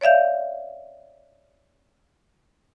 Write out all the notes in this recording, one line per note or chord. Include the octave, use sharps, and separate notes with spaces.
C#5 D5 E5 F5 G6